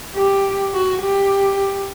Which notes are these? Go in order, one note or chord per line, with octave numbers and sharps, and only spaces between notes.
G4
F#4
G4